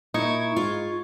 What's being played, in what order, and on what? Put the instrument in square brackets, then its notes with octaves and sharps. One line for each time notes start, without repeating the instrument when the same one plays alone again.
[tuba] A#2 [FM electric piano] D#4 C#6 G#6 [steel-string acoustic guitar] E4
[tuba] G#2 [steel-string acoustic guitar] F4